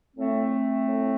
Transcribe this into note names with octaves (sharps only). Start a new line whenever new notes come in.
A2 A3 C4
A2